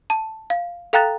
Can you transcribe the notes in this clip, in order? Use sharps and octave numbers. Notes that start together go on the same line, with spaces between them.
A5
F5
A4 F5 G5 A#5 F#6 A6